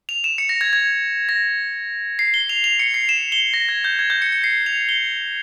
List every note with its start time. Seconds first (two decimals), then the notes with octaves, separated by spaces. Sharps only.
0.09 F7
0.24 E7
0.38 C#7
0.49 A#6
0.61 G#6
0.73 G#6
1.29 A#6
2.19 C7
2.34 G7
2.49 F7
2.64 F7
2.79 C#7
2.94 C7
3.09 E7
3.32 G7
3.54 A#6
3.69 G#6
3.84 G6
3.99 G#6
4.10 G6
4.22 C#7
4.32 C#7
4.44 C7
4.66 F7
4.89 G7